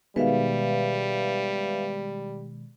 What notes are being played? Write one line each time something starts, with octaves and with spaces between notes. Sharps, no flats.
B2 D#3 G3 G#3 B4 E5 F5